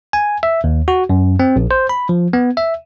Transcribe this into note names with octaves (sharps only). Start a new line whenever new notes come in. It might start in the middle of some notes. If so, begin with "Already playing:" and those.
G#5
E5
D#2
F#4
F#2
C4
A#1
C5
B5
F3
B3
E5